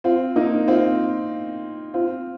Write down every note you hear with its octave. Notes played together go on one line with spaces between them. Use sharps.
C4 F4
A#3 D#4
C4 F4
C4 F4